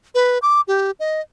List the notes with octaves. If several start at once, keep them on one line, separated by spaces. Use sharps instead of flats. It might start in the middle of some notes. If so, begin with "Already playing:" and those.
B4
D6
G4
D#5